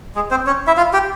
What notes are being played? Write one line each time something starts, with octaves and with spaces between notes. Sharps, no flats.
G#3 G#4
C4 C5
C#4 C#5
E4 E5
F4 F5
G4 G5